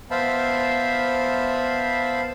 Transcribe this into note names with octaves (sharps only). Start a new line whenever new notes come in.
B3 C5 E5 F5 A5 B5